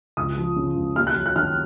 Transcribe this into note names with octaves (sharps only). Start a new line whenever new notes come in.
C#2 D#6
F3
C#3
C#2
D#2 F6
F#6
F#3
F#6
D#3 F6